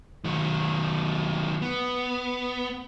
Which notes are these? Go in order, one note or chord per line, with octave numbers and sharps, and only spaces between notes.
D#3 F#3
B3